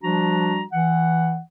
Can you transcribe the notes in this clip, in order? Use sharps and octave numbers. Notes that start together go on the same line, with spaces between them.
F3 G3 D4 F#4 A#5
E3 F#5